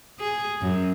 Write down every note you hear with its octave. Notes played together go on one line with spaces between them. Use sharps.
G#4
F#2